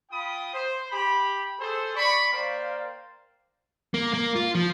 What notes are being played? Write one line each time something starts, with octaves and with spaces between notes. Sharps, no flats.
F4 G5 B5 D#6
C5
G4 B5
G#4 A4 C5
D5 B5 C#6
A#3 A#4 C5 D5 F5 G5
A#3
A#3
F4
F3